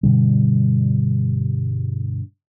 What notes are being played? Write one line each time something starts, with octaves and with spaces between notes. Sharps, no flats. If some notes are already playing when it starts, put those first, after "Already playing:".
G2 B2 D3 G3